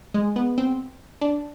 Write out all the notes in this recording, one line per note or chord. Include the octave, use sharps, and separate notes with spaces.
G#3
B3
C4
D4